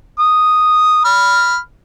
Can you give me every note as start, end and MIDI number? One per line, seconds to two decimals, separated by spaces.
0.19 1.02 87
1.04 1.57 83
1.04 1.57 89